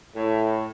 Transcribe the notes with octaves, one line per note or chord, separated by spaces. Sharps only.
A2